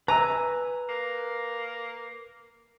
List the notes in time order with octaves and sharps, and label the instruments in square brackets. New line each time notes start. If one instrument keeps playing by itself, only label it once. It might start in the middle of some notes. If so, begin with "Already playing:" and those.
[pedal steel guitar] B4 G#5 E6 [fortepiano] A#5
[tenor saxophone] A#3